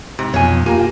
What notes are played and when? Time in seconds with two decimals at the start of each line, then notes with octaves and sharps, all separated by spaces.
0.19 G#2 C3
0.34 B1 F2 B2 F3 C#5 G#5
0.66 A#3 F4 G4 G#5 A#5